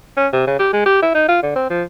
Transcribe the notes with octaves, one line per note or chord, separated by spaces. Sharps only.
C#4
C3
C#3
G4
G#3
G4
E4
D#4
F4
D3
C4
F3